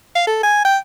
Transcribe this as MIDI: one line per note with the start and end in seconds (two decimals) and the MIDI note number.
0.15 0.22 77
0.27 0.42 69
0.43 0.63 80
0.65 0.78 79